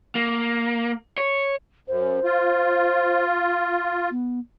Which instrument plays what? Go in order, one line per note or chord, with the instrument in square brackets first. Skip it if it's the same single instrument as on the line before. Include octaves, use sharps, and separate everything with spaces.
[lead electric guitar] A#3
C#5
[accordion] F#2 [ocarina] C5
[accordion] F4
[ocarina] B3